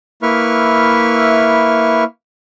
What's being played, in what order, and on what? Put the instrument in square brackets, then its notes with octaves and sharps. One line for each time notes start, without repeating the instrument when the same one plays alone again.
[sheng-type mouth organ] A#3 E4 B4 E5 C#6 F6